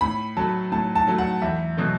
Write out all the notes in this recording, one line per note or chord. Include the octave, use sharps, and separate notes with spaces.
A2 B5
F#3 A3 A5
A2 A5
A5
F#3 A3
F#5
E2 E5
B2 F#3 A3